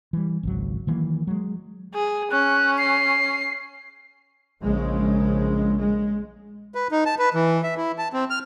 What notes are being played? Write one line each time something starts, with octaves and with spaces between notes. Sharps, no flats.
E3 G3
G#1 C#2 F#3
D#3 E3 F#3 A#3
F#3 G#3
G#4
C#4 F#6
C7
A#1 C#3 G#3
G#3
B4
D#4
A5
B4
E3
E5
E4
A5
C4
F6